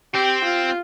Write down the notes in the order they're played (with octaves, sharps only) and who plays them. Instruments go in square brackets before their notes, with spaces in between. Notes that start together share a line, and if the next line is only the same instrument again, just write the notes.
[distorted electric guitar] C4 [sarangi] G4
[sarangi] F4